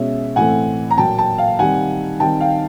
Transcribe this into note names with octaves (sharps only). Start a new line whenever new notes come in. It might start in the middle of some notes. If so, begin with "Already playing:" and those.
Already playing: B2 G#3 C#4 E5
A2 E3 A3 C4 F#5 G#5
A#5
A#2 F#3 A#3 G5 A5
G5 A5
F5 G5
D#3 G3 C4 F#5 G#5
D#3 G3 C4 G5 A5
F5 G5